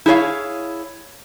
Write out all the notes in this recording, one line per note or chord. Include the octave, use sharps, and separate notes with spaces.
E4 G#4 A4 C#5 F5